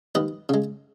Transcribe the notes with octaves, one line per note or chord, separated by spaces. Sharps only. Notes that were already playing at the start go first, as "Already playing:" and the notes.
D#2 B4 D#5
C#3 G#3